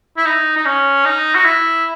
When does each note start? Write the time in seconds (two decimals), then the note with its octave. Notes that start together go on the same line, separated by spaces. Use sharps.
0.17 E4
0.26 D#4
0.57 D#4
0.65 C#4
1.05 D#4
1.35 F#4
1.45 E4